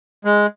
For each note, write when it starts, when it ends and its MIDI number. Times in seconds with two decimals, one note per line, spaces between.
0.25 0.46 56